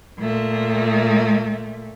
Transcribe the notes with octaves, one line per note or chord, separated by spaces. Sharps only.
A#2 A3